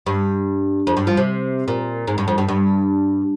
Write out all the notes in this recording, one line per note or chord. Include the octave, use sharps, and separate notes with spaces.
G2
F2
G2
F3
C3
A#2
G#2
G2
F2
G2
G2